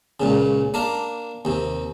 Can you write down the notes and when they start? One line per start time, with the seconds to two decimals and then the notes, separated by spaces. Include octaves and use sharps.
0.20 C#2 A#2 C#3
0.74 A#3 D4 A#4
1.45 D#2 C3